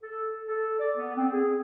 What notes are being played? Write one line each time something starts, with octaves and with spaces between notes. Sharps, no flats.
A4
A4
D5
B3
C4
G#4